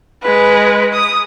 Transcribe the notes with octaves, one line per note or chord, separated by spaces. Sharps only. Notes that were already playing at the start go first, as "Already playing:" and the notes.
G#3 B4
D#6